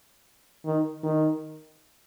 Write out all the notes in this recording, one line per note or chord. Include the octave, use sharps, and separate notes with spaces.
D#3
D#3